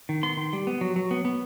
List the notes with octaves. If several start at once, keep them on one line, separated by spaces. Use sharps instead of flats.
D#3
B3 C6
D#3
G3
B3
F#3
F#3
B3
B3